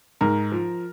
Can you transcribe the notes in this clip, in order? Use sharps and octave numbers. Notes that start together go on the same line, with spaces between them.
G#2 A#4
F3